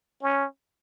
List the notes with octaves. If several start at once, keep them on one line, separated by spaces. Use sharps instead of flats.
C#4